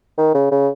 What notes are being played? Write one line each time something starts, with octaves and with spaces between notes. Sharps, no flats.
D#3
C#3
C#3